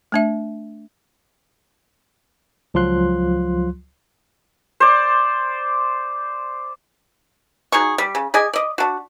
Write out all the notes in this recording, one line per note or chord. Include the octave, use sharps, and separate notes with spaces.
A3 D4 E5
C#2 F3 F#3 F4 C6 F#6
C5 D5
F#3 D#4 G#4 C#6
G3
C#3
G#4 D5 D#5 G#5
D5 D#5
D4 F#4